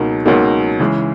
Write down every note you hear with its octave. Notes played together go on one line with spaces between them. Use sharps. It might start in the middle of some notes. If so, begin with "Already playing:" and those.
Already playing: C#2 B2 F#3 A#3 D#4
C#2 B2 F#3 A#3 D#4
C#3 E3 G#3